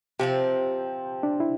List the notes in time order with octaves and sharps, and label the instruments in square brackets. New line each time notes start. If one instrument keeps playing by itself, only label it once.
[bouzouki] C3 F3 C4 [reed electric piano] G4
[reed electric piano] D4
E4